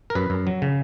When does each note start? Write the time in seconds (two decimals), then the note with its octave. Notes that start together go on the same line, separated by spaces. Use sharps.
0.10 A#4
0.15 F#2 B4
0.30 F#2
0.47 F#3
0.62 C#3